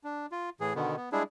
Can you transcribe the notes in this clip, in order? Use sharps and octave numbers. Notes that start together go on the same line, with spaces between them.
D4
F4
A2 E3 G#4
B2 D3 D#3 B3
B3
G3 G#3 D4 E4 G#4